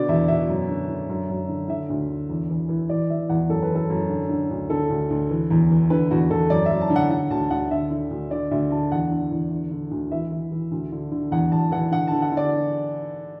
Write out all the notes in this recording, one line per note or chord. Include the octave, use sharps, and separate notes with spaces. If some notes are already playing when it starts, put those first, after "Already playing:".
Already playing: B2 D3 D5
E2 E5
B2 E5
F#2
D3
D3
F#2
F#2
D3
D3 E5
D2
D3
E2
E3
E3
E3 D5
E3 E5
E2 F#5
F#2 A4
B4
E3
A4
F#2
D3
D3
D2
D3 A4
D2
D2
E3
E2
E3
D3 B4
E2 F#4
E2 A4
F#2 D5
F#2 E5
A5
D3
F#5
D3 F#5
D2 A5
D2 F#5
D3 E5
D3
D2
D3 D5
D2 E5
D3 A5
E2 F#5
D3
E2
D3
D3
D2
E3 E5
E3
E3
D2
D3
D3
E2 F#5
E2 A5
E3 F#5
D3 F#5
D3 A5
F#5
D3 D5